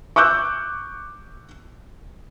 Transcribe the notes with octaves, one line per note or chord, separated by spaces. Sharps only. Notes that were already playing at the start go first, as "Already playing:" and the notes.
C#6 D6 E6 F#6 G6